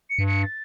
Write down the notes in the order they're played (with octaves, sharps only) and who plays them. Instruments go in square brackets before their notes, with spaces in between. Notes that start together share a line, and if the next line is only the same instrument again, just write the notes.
[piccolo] C#7
[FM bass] G2
[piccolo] C#7
A6